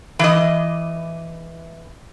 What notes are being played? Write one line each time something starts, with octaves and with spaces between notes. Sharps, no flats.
E3 D#5